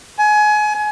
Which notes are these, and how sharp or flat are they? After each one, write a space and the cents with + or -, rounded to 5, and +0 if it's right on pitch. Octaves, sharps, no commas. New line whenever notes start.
G#5 +25